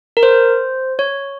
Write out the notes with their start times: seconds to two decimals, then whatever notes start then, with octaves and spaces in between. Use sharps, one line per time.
0.17 A#4
0.23 C5
0.99 C#5